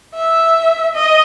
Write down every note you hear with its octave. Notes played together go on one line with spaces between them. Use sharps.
E5
D#5